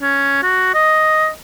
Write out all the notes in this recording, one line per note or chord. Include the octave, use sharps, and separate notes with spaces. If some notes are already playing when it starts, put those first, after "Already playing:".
C#4
F#4
D#5